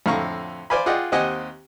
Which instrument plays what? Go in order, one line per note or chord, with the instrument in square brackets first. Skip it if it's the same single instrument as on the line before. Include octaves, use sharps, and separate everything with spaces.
[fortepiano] F2 A2 D3 F5 A#5 C#6
C5 D5 F5 G#5 B5
F4 G#4 D5 D#5 F#5 G5
D#2 C4 G4 D#5 F#5 G#5